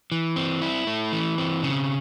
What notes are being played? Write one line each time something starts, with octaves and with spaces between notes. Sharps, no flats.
E3
C4
E4
A3
E3
C4
C#3